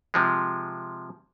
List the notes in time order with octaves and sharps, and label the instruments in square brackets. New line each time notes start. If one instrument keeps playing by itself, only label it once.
[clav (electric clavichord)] C3 F3 G#3